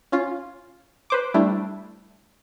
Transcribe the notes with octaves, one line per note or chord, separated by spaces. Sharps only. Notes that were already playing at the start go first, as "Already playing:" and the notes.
C#4 F4
B4 C5 D6
G3 A3 D4 E4